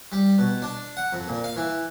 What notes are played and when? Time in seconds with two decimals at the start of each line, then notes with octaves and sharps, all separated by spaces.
0.12 G3
0.38 B2
0.62 D4
0.97 F#5
1.13 F2
1.27 A#2
1.44 F5
1.56 E3